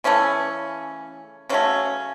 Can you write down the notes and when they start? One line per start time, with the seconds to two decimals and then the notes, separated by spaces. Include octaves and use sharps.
0.04 C#3 E3 A3 C#4
1.49 C#3 F#3 A3 C#4